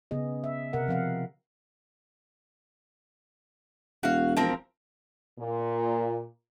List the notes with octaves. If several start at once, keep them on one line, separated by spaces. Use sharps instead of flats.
C#3 B3 G#4 D#5
E5
C3 A#4 F#5
F3 C4 F5 F#5
E1 F#4 F5
F3 C4 A#4
A#2